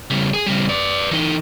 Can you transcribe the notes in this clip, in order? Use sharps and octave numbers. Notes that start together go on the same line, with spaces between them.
C#3 G3
G#4
C#3 G3
B4 D5
E3 D#4